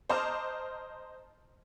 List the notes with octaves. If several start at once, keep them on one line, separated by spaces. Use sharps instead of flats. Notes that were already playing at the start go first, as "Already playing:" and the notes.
C5 D#5 A5 A#5 D6 F6